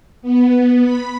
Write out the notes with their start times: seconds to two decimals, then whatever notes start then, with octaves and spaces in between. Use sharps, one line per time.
0.22 B3
0.83 B5